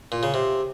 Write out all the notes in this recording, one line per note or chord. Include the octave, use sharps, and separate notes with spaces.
A#2
C#3
C3